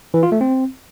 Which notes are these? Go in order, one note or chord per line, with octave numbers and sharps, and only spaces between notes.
E3
F4
A3
C4